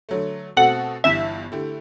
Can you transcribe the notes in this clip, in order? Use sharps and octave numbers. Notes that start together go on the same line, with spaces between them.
D3 F#3 A3
B2 A3 C4 F#4 A4 F#5
G1 G2 E3 E5
D3 A3 E4 G4